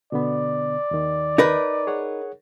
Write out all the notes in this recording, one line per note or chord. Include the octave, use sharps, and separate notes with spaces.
B2 D3 B3 D5
D#2 D#3
D#4 A#4 B4
G#4 C#5 F#5